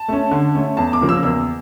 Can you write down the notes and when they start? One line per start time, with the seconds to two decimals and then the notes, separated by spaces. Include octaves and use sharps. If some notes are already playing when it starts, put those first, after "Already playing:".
Already playing: A5
0.08 A3 C#4
0.31 D3
0.55 A3 C#4
0.77 E2 A5
0.93 D6
1.01 C#3 F3 A#3
1.09 E6
1.23 E2 E6